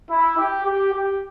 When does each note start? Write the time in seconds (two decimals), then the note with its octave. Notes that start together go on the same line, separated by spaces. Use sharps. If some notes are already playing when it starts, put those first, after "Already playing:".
0.10 E4
0.37 G4
0.65 G4
0.93 G4